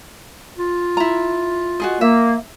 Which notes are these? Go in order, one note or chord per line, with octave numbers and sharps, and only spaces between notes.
F4
E4 A#5
F#4 G#4 D#5
A#3 E5